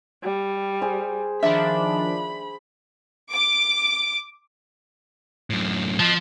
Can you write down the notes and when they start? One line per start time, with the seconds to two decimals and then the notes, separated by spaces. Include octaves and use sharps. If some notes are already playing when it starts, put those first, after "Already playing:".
0.23 G3
0.82 G#4 C5
1.43 D#3 F3 D4 E5 B5
3.31 D6
5.50 F#2 A2
6.00 F3 D#5 A5